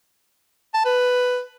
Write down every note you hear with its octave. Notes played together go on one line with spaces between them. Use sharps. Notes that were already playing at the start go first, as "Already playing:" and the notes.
A5
B4